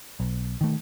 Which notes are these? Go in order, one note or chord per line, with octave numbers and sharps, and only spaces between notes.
B1
D#3 A3